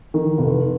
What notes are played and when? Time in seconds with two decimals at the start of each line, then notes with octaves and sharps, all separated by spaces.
0.14 D#3
0.38 F1